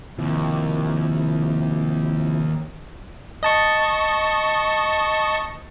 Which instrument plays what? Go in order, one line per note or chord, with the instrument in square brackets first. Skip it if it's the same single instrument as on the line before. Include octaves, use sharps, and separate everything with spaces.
[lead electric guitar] D#2 [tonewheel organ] C3 F3 E4
[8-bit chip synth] D#5 A5 C#6